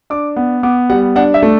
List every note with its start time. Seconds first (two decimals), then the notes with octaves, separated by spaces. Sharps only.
0.10 D4 D6
0.36 B3
0.63 B3 D6
0.90 G3 F#5
1.16 D4 F#5
1.34 E5
1.43 A3